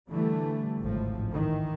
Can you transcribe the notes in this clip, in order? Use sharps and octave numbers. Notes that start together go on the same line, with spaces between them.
D3 E3 G3 A3
G#1 C#2 A2 F3
D#3 E3